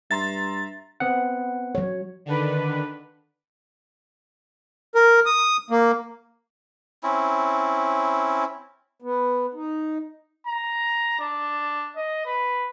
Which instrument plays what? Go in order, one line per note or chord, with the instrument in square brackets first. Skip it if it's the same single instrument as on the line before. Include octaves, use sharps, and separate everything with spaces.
[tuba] G2 [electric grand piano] E5 A#5 C6 [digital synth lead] A6
[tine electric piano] B3 C4 F#5
[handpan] F#3 C#5
[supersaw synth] D3 D#3 D4 B4
[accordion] A#4
D#6
A#3
[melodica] C4 C#4 E4
[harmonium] B3
D#4
[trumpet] A#5
D4
D#5
B4